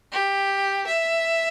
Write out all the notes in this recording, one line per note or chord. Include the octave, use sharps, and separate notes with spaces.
G4
E5